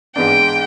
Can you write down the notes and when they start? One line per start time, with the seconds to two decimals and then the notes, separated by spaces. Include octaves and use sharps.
0.15 G#2 E3 G#3 B3 D4 G5